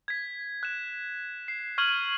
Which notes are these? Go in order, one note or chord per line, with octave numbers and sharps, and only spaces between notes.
G#6 B6
F#6 E7
C7
C#6 F6 G#6 D#7 F#7